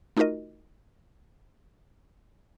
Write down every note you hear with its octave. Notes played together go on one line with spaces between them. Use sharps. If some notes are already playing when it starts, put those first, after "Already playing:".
A3 D#4 F4 F#4 A#4 D#5